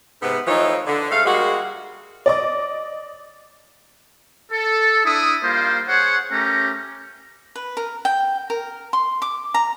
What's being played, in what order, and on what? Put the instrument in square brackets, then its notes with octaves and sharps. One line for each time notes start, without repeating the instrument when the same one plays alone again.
[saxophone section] G#2 C3 B3
E3 F3 A3 D#4 C#5
D3
G#2 A3 F5
G3 G#3 A#3 F#4
[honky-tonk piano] D5 D#5 D6
[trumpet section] A4
D4 E4 D#6
G3 A#3 F4 C5
G#4 C5 C#5 F#5
A3 C#4 G4 A#4 A#5
[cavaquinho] B4
A#4
G5
A#4
C6
D6
A#5